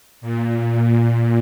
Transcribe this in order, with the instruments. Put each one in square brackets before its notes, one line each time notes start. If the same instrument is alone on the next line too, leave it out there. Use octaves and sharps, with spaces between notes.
[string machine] A#2